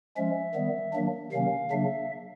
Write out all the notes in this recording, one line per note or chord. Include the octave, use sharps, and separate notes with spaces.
F3 G#3 C#4 E5
D#3 G3 B3
D#3 F#3 A#3 D4
C3 D#3 F#3 A#3 C#4 F5
C#3 F#3 A#3 D4 E5